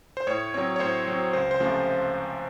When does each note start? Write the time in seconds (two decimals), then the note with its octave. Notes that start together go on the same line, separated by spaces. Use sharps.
0.17 C5
0.27 A2 C#5
0.54 F#3 C4 C#5
0.76 C#5
0.80 A2 C5
1.08 F#3 C4
1.33 C#2 C5
1.51 C5
1.60 C3 F3 A3 C#4